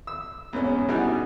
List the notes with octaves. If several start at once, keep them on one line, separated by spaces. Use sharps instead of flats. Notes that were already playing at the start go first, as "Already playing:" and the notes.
E6
E2 G#2 C#4
B2 G3 D#4 E4 F#4 G#4